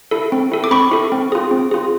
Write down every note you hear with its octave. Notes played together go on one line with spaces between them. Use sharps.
E4 A4
C4
E4 A4
D6
C4 B5 C#6
E4 A4
C4
F4 G#4
C4
F4 G#4